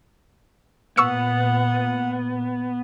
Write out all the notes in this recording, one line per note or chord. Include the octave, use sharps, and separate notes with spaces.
A#2 B3 F#5 C#6 E6 C#7